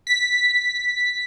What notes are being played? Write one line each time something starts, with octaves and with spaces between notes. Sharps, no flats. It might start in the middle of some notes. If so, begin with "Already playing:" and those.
B6